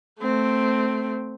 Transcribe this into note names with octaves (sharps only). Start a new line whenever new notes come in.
A3 C4